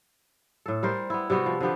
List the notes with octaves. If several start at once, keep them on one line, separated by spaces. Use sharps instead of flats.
A2 A4
G3 A#4 C5
B3 E4
C3 G3 B3 F#4
F3
D3 F3 B3 G4